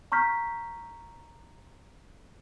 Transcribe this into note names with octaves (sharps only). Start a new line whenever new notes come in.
A#5 C#6 F6 G6 B6